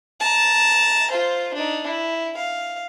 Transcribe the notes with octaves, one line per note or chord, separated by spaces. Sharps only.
A5 A#5
F4 C5
D4 D#4
E4
F5